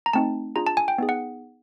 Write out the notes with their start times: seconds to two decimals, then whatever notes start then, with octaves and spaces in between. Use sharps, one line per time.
0.06 A#5
0.13 A3 C4 D#4 A5
0.56 D4 F4 G#4 A#5
0.67 A5
0.77 G#5
0.88 G5
0.98 B3 D#4 G#4
1.09 F#5